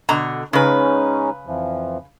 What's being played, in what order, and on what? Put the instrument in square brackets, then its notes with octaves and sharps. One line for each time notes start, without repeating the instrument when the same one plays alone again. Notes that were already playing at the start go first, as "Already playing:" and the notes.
[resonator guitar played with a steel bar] B2 D3 A#5
[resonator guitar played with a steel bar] C#3 B4 [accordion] G#3 C#4 D#4
[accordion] F2 E3 F3